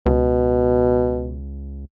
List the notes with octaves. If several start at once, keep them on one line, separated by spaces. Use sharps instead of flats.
C#2 B2